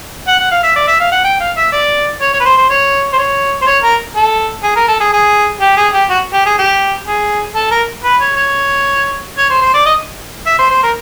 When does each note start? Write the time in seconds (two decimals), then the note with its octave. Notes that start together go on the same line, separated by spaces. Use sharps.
0.28 F#5
0.39 F#5
0.51 F5
0.63 E5
0.76 D5
0.87 E5
1.00 F5
1.12 F#5
1.24 G5
1.40 F5
1.57 E5
1.72 D5
2.21 C#5
2.33 C#5
2.40 B4
2.45 C5
2.58 C5
2.70 C#5
3.13 C5
3.18 C#5
3.62 C5
3.67 C#5
3.83 A#4
4.16 A4
4.63 G#4
4.76 A#4
4.88 A4
5.00 G#4
5.13 G#4
5.61 G4
5.77 G#4
5.93 G4
6.10 F#4
6.33 G4
6.46 G#4
6.58 G4
7.07 G#4
7.55 A4
7.71 A#4
8.04 B4
8.20 C#5
8.36 C#5
9.38 C#5
9.50 C5
9.61 C5
9.74 D5
9.86 D#5
10.46 E5
10.59 C5
10.71 C5
10.83 A#4